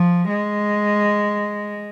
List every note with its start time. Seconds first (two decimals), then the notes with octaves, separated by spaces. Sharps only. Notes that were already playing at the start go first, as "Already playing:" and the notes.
Already playing: F3
0.29 G#3